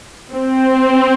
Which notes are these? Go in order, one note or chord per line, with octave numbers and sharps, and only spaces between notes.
C4